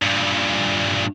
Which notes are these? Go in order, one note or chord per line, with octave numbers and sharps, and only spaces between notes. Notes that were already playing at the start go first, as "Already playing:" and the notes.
G2 A#2